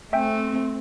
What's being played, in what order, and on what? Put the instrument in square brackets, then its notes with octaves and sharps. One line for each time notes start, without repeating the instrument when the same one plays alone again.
[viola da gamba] A3 [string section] C4 [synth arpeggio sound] E5 G5 G#5